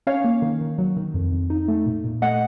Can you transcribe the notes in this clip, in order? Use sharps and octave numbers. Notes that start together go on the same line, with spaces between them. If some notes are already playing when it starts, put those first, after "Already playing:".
C#4 C#5 F5
A#3
D#3
D#3
F#3
D#3
F2
F2
D#4
A3
A#2
A#2
A3 D#5 F#5